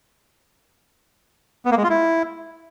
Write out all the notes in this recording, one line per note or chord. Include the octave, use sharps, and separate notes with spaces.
B3
A#3
G#3
F4
E4